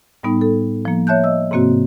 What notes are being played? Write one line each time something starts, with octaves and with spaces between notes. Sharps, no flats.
A2 G3 B3 D#4
A4
F3 A#3
C#5 E5 A5 F#6 G6
D#5 E6
G#2 C3 A#3 C4 F#4